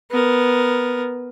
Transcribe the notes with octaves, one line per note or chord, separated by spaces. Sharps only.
B3 A#4